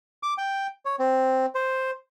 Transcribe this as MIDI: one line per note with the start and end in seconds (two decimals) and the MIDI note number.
0.23 0.34 86
0.38 0.67 79
0.85 0.96 73
0.99 1.46 60
1.55 1.91 72